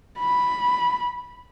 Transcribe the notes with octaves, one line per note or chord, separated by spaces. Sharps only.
B5